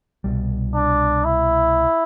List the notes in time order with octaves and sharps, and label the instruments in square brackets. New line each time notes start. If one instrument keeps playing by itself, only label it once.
[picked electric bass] C2 B2 G3
[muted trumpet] D4
E4